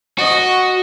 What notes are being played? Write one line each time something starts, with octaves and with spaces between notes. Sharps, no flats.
F#4 D#5